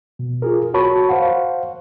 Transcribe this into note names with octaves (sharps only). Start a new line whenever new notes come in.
B2
F4 G#4 A#4
F#4 A#4 C#5 A5 B5 C#6
C5 F5 F#5